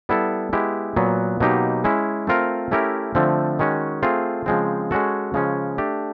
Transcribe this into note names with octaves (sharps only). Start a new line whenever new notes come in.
G3 B3 E4 A4
G#3 B3 E4 G4
A#2 F#3 B3
B2 F#3 A#3 D#4 G4
G#3 C#4 E4
A3 C4 F4 A#4
A3 C#4 E4 G4 A#4
D3 F3 A3 C4
D#3 G#3 C#4 F#4
A3 C4 F4 G#4
C#3 F3 G#3 C4
G#3 C#4 F#4 A4
C#3 F3 G#3 C#4
A3 D4 G4